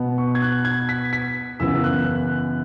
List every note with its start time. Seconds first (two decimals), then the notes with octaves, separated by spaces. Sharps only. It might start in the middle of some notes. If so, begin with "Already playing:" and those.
Already playing: B2 B3
0.18 C#6
0.35 G#6
0.42 F#6
0.65 G#6
0.89 B6
1.13 B6
1.60 F#2 C#3 E3 B3 E6
1.84 F#6
2.05 F#6